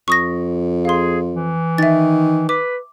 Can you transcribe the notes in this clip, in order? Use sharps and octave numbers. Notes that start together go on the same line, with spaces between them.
F2 C#6 D#6 A#6
G#4 F5 C6
E3
D#3 E5 A6
B4 D6